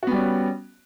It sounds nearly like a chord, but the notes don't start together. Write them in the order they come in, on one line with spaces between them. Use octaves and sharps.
F#4 B3 G3 C#4